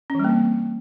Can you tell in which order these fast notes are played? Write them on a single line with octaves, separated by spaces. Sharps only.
C#4 E3 G3 A#3 C4